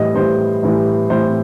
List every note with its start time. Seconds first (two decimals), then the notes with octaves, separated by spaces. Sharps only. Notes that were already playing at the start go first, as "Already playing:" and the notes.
Already playing: A2 E3 G3 D#5
0.15 A2 E3 G3 C5
0.63 A2 E3 G3
1.10 A2 E3 G3 C5